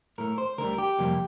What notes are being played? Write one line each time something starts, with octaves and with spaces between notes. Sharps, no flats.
A2 A3 A#4
C5
D2 D3 G3 A#4
G4
F2 C3 G3 A#3